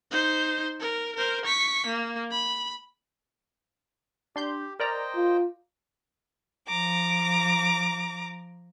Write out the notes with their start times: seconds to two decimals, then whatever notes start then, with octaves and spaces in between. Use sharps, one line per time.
0.11 D#4 C5
0.80 A#4
1.16 A#4 C5
1.45 C#6 B6
1.86 A#3
2.31 B5
4.36 D4 G4 C6 G6
4.80 A#4 C5 D5 D#5 G5 A#5
5.16 F4
6.68 F3 A#5 D6